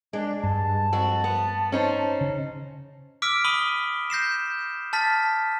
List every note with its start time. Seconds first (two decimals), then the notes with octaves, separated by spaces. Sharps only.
0.13 G#3 D4
0.43 G2 A5
0.93 F2 F#4
1.24 B3
1.72 C#4 D#4 C5
2.21 C#3
3.22 D6 E6 F6 B6 D7
3.44 B5 D#6 D#7 G7
4.10 G6 A#6 C7 E7
4.93 A5 F6 A6 B6